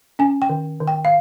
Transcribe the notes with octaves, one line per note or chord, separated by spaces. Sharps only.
C#4 G#5
G5
D#3
D#3
G5
F5